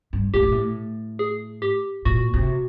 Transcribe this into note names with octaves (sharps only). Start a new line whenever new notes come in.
G2
A2 G4
A#2
A2
G#4
G4
A#2 F#4
C3